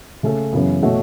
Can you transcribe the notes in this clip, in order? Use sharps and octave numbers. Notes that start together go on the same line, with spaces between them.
C#3 A3 C#4 A4
F#2 C#3 E3 B3
B2 A3 F#4 C#5